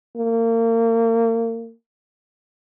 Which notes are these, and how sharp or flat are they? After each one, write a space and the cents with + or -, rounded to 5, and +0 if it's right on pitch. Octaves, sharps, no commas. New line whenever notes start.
A#3 -35